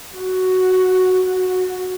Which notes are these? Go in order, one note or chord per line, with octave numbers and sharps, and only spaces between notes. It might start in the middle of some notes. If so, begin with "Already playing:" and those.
F#4
F#4